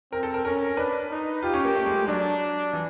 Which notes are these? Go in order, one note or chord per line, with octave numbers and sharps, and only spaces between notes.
C4 A#4
A4
A#4
C#4 A#4
D4 B4
D#4
F4 G4
C#4
A#3
A3
G#3
G#3
F#3 D4
E3